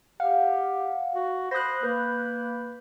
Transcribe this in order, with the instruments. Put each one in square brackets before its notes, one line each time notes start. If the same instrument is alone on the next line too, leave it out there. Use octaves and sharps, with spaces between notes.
[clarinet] G4 [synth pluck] F5 [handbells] F#5
[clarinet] F#4
[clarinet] C5 [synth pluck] B5 F#6 [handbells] D#6 A#6
[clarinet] A#3 [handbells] B4 G6